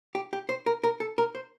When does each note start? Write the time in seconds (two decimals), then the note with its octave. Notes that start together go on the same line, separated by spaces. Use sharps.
0.15 G4
0.33 G4
0.49 C5
0.66 A#4
0.84 A#4
1.00 A4
1.18 A#4
1.35 C5